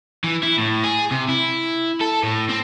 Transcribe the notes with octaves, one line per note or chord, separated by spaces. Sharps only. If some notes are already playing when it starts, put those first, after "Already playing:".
E3
E4
A2
G#4
C3
E4
A4
A2
C4